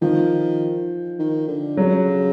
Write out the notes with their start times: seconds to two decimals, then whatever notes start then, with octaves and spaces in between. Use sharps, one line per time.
0.01 D#3 F3
1.19 D#3
1.48 D3
1.77 C#3 F#3